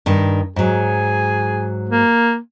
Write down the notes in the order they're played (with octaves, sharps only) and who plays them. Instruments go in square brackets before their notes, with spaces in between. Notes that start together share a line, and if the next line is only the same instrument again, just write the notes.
[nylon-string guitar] G2 D#3 D#4
[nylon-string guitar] G#2 F#3 [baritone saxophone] G#4
[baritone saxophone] A#3